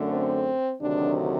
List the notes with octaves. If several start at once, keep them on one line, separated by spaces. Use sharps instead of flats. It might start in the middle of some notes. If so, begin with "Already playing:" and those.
Already playing: F#2 D3 A3
C4
D2 C3 D#3 F#3 D4